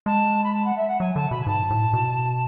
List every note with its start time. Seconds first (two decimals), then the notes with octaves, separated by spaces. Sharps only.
0.06 G#3 A5
0.44 B5
0.53 A5
0.65 F#5
0.76 E5
0.88 F#5
1.00 F#3 G#5
1.15 D3 A5
1.31 B2 B5
1.41 G#5
1.46 G#2 A5
1.70 A2
1.93 B2